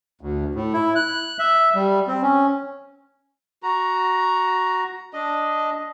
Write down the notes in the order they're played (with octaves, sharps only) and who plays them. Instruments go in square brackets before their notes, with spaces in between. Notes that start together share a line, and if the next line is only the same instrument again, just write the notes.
[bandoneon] D2
A2
E4
F#6
E5
G3
C4
C#4
[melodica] F#4 A#5
D4 D#5